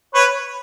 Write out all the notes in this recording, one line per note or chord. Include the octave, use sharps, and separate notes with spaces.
B4 C#5